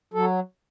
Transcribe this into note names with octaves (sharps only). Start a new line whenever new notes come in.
F#3 A4